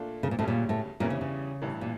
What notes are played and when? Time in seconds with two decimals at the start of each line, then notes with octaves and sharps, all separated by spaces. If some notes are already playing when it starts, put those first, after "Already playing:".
Already playing: A#2 A3 D4 F4
0.23 C#3
0.31 A#2
0.39 D2 A2 C#3 G3 C#4
0.48 A#2
0.69 A2
1.00 E2 A#2 E3 G3 C#4 E4
1.10 C#3
1.21 C#3
1.62 A1 G2 E3
1.81 A#2